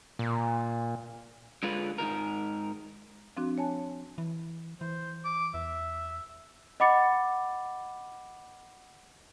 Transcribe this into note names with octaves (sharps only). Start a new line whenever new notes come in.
A#2
D3 G#3 F4 B4
G#2 C3 D#3 A#4
F3 C4 D4 F#4
C#5 G#5 A5
E3
E3 C5
D6
E2 E5
D#5 F#5 B5 D6 A6 C#7